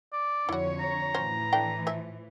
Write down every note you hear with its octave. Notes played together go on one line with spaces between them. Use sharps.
D5
F2 D3 E4 F#4 C#5
A#5
A2 E3 C#4 F#4 C5
A3 D4 G5
F3 E5 G#5